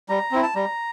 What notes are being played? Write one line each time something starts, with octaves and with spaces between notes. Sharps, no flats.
G3 A#5
C4 E4
A5
G3 A#5